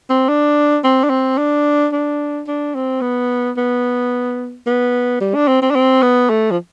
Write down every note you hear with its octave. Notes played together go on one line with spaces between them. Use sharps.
C4
D4
C4
D4
C4
D4
D4
D4
C4
B3
B3
B3
G3
D4
C4
C4
D4
C4
B3
A3
F3